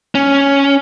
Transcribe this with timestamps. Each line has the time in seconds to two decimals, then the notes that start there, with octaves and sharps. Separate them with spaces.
0.15 C#4